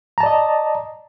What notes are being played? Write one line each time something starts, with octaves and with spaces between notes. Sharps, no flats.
D5 D#5 A5 A#5